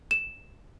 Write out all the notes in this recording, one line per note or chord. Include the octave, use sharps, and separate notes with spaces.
E7